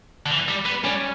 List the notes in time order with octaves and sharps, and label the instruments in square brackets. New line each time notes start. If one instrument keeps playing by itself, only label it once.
[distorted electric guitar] D3
E3
G3
B3
[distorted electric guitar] G3 [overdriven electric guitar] C#4